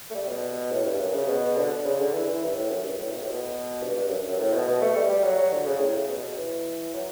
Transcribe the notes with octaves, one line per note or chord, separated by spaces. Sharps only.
A3
G3
B2
A2
G2
F#2
C#3
B2
D3
C#3
D3
E3
E3
G2
A2
F#2
G2
A2
B2
A2
B2
G2
G2
F#2
F#2
A2
B2
B2
A3
G3
G3
F#3
F#3
D3
C#3
A2
C#3
B2
B2
E3
F#3